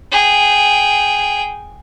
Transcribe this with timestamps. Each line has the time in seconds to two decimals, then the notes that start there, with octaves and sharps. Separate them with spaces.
0.12 G#4 G5